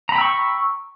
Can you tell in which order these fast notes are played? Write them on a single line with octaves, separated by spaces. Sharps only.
A#5 B5 G5 E6 C#6